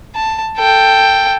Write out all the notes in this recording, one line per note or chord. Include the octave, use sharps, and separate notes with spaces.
A5
A4 G5